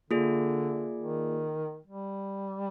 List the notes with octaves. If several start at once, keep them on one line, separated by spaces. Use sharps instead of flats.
D3 A#3 F4 G#4 D5
D#3
G3